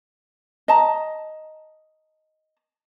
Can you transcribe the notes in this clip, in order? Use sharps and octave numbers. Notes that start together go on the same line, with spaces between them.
D#5 A5 A#5